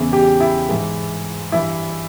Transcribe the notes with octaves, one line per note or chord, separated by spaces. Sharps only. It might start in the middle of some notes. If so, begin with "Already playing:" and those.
Already playing: E2 C#3 E3
G4
E4
G#2 E3
G2 E3 E4